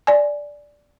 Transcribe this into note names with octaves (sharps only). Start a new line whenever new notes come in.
D5 G#5